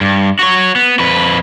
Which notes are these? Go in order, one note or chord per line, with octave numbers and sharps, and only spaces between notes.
G2
F#4 C#5
B3
F2 B4